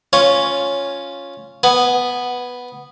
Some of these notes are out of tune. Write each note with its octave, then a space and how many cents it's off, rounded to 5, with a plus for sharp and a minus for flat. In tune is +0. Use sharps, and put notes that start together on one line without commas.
C#4 +0 F4 +0 C#5 +0
B3 +0 G#5 +0